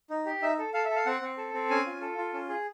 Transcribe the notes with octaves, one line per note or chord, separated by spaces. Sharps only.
D#4
G4
D#4 E5
A4
A4 F5
E5
A4
F5
C4 F#5
C4
A4
C4
C#4 G#5
F4
A4
F4
C#4
G#4